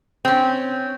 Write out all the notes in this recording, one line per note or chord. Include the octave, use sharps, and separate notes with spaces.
C4 C#4